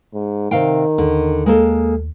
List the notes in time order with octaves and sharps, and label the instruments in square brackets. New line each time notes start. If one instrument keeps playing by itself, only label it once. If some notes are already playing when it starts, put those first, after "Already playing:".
[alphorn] G#2
[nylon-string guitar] C3 F5 G5 [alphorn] D#3
[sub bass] D#2 [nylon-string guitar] D3
[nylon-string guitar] G#3 A#3 A4